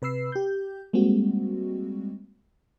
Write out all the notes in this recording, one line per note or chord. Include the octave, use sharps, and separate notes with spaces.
C3 B4 B5 E6 C7
G4 G6
G3 G#3 A#3 C4 F#4